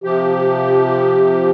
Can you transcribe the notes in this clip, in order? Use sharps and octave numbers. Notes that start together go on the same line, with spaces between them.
C3 F3 G4